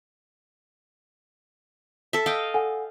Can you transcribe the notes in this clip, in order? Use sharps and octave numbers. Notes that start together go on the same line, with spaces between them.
A4 E5
D#5 F5 G5
A4 F#5 G#5